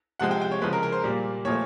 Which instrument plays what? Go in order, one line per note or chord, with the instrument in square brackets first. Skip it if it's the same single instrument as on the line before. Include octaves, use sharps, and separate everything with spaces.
[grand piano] C3 F3 G#3 F#5
G5
G5
C#5
C#3 F3 G#3 B4
A#4
A#4
C5
A#2 G3 A#3
A#2 F3 A3 C#5